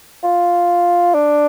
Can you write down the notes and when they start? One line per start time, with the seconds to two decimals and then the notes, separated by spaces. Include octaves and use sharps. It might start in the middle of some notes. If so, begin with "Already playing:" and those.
0.24 F4
1.15 D4